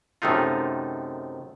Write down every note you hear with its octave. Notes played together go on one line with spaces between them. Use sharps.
F#2 C3 D#3 A3 D#4 F4